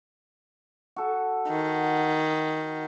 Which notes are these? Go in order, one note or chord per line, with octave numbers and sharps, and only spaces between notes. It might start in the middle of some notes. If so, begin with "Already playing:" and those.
F#4 A4
D#3